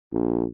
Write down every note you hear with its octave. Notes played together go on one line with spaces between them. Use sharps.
A#1